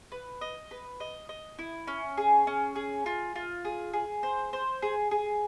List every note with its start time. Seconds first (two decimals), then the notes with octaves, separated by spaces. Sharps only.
0.12 B4
0.41 D#5
0.71 B4
1.00 D#5
1.29 D#5
1.59 E4
1.87 C#4
2.18 G#4
2.47 C#4
2.76 G#4
3.06 F4
3.36 F4
3.65 G#4
3.93 G#4
4.23 C5
4.53 C5
4.82 G#4
5.11 G#4